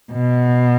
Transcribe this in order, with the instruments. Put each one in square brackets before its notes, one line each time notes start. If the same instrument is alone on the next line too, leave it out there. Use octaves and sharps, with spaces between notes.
[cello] B2